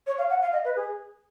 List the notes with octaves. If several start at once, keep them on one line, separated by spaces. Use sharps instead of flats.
C#5
F5
F#5
F5
D#5
B4
G#4